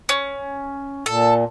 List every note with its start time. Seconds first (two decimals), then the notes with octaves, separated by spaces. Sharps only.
0.09 C#4
1.06 A#2 A4